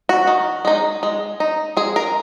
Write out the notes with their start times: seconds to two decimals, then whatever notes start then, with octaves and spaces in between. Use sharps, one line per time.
0.09 F#4
0.27 D#3
0.65 G#3 D#4
1.03 G#3
1.40 D#4
1.77 G#3 G#4
1.96 A#4